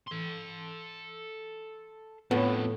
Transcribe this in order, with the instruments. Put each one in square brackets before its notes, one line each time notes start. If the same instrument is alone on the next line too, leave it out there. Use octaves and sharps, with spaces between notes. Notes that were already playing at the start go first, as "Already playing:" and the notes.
[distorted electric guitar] A4 C6
[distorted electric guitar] F2 D3 [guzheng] A2 [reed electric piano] B3 F4